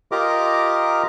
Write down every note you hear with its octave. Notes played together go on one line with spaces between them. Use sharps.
F4 G4 A#4 D#5 A#5 D6